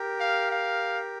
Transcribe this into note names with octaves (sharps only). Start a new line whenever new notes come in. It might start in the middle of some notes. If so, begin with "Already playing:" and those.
Already playing: G4 A#4
F5
F5